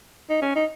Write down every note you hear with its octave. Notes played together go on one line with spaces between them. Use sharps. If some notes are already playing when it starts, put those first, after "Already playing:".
D#4
C#4
D#4